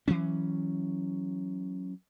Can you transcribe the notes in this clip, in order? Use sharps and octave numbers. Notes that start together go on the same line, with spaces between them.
E3 F#3 C#4